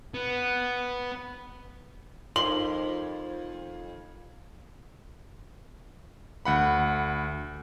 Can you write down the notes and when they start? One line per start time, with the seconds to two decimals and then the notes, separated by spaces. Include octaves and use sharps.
0.14 B3
2.36 F2 D#4 F4 A#4 C6 F#7
6.45 D2 F#5 B5